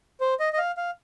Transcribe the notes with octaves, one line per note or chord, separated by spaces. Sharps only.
C5
D#5
D#5
F5
F5